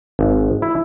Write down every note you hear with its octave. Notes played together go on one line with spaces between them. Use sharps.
G#1
E4